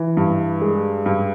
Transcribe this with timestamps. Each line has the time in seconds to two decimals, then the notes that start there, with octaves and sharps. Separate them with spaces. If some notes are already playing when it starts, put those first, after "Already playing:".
Already playing: E3
0.17 G2
0.61 G#3
1.06 G2